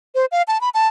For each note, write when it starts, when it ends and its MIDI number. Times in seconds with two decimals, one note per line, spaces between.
0.15 0.26 72
0.32 0.42 77
0.48 0.61 81
0.61 0.69 83
0.74 0.88 81